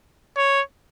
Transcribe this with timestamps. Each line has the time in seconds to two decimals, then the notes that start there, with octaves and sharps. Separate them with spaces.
0.37 C#5